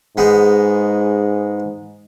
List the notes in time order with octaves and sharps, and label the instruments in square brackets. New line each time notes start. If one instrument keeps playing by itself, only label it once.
[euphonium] G#2 [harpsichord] G#3 B3 D#4